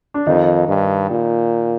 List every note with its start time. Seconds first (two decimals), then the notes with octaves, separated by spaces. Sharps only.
0.14 D4
0.27 F2 D#3 D#4
0.68 G2
1.10 A#2